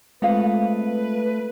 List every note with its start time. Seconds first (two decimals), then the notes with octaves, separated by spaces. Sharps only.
0.22 G#3 A3 C4 F4 B4 D#5 F5